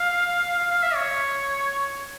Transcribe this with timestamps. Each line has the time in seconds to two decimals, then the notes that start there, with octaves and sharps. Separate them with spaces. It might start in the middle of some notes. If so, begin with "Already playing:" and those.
Already playing: F5
0.59 F5
0.71 F5
0.83 E5
0.95 C#5